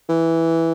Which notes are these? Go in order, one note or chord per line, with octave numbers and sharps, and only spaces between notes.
E3